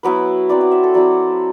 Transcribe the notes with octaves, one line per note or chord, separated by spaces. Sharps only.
F#3 B3 E4 B4
F#3 C4 E4 D5
F#5
E5
A4
F#3 C4 E4 D5